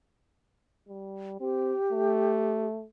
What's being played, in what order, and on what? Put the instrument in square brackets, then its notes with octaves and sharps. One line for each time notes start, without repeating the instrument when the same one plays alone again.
[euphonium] G3
[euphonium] C4 [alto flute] G4
[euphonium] A3